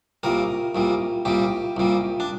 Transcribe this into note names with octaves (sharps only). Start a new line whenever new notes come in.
C2 A#2 G3 A#4
C2 A#2 G3
C2 A#2 G3 G4
C2 A#2 G3
D4